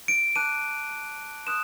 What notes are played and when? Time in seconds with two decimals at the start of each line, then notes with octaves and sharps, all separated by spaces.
0.08 D7
0.36 A5 D6 F#6 D#7
1.47 C6 D#6 F#6 E7